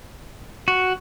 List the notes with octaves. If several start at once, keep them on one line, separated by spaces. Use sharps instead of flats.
F#4